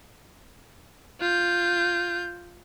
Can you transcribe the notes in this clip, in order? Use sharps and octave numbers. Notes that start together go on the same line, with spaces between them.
F4 G6